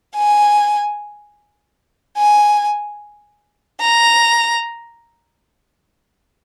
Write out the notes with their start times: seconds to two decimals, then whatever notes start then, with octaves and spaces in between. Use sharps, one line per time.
0.16 G#5
2.18 G#5
3.81 A#5